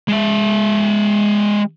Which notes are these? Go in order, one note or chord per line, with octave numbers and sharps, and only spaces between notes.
G#3 E5